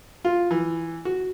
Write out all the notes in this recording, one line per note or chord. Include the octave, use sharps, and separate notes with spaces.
F4
E3
F#4